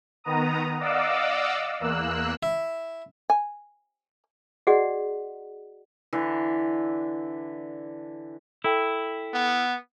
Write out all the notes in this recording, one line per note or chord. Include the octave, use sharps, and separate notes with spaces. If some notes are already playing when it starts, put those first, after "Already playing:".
D#3 B3 A#5 D#6
D5 D#5 F5 F#5 D6 E6
E2 A#3 E6 F#6
E4
G#5
F#4 G#4 D5 D#5 F#5
D3 E3 B4 E5
E4 A4 G5
B3